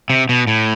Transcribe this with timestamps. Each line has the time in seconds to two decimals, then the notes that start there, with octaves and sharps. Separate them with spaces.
0.10 C3
0.29 B2
0.47 A2